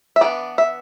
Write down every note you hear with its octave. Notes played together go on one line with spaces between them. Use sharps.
E5
E3 B3 D4 D5
E5